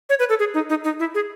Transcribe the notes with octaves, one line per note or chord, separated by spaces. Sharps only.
C#5
B4
A4
G#4
D#4
D#4
D#4
E4
G#4